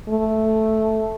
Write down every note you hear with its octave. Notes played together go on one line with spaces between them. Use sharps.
A3